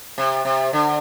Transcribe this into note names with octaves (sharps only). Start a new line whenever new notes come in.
C3
C3
D3